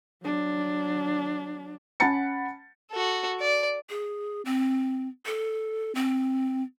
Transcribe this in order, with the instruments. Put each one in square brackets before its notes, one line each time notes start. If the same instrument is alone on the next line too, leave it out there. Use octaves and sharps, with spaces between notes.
[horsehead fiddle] F#3 D4
[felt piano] C#4 F#5 A5 B5 A6 C#7
[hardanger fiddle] F#4 A4
D5
[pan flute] G#4
C4
A4
C4